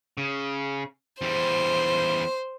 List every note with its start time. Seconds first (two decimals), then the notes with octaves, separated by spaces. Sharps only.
0.18 C#3
1.22 E2 G3 C5